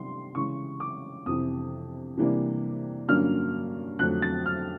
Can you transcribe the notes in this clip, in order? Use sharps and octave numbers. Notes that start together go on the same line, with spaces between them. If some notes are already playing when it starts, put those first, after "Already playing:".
Already playing: C3 D#3 G3 C6
C#3 E3 G#3 C#6
D6
F2 C3 E3 D#6
C3 E3 G3 A#3 D4
G2 D3 F#3 A#3 C#4 F6
F2 D3 F#3 A3 F#6
A6
F6